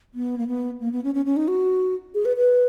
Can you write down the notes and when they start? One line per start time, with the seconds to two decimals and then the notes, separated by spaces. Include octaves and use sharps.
0.14 B3
0.38 A#3
0.47 B3
0.81 A#3
0.92 B3
1.04 C#4
1.14 C#4
1.25 C#4
1.37 D#4
1.48 F#4
2.14 G#4
2.25 B4
2.37 B4